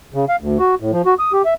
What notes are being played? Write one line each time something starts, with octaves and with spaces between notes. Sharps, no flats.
C#3
F5
D2
F#4
A2
F3
F#4
D#6
G4
E5